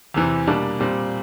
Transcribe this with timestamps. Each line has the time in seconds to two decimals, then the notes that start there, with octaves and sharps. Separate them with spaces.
0.14 E2 C3 E3
0.47 B2 G3 A#3 D4
0.80 A#2 G3 C4